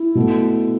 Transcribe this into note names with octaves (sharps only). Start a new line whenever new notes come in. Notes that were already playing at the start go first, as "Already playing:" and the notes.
Already playing: E4
B2 A3